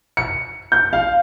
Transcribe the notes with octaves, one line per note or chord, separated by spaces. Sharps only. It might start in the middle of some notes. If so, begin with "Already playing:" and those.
C#7
G6
F5